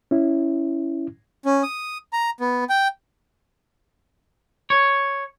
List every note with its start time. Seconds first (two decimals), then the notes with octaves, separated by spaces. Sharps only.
0.11 C#4 E4
1.45 C#4
1.63 D#6
2.13 A#5
2.40 B3
2.69 G5
4.70 C#5